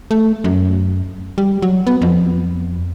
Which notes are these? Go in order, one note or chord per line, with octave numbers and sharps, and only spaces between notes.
A3
F#2
G3
F#3
B3
F2